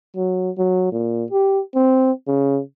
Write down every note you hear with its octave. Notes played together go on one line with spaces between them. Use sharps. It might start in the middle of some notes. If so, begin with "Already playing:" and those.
F#3
F#3
A#2
G4
C4
C#3